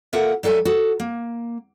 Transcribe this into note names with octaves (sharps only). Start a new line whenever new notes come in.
A#3 F4 A4 A#4 E5 F#5
F#3 G3 A4 E5 G#5
F#4 A4
A#3